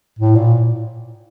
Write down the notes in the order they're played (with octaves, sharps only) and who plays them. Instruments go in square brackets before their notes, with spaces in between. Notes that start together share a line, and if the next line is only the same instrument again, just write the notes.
[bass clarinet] A2
A#2